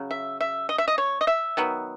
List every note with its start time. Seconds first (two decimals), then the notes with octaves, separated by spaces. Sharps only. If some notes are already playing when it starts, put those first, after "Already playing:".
Already playing: C#3 F#3
0.11 E5
0.41 E5
0.69 D#5
0.78 E5
0.88 D#5
0.98 C#5
1.21 D#5
1.27 E5
1.57 D#3 F#3 B3